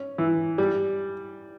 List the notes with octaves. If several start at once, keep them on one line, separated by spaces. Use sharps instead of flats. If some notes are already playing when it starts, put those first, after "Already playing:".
Already playing: C#4
E3
G3